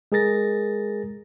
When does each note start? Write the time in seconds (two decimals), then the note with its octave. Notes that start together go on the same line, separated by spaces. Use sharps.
0.12 G#3 G#4 A#4 A6 A#6